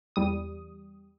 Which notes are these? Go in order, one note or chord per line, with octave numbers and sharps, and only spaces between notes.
E2 G3 D#6